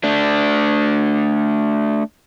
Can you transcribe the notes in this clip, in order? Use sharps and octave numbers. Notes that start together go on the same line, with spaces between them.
A3 D4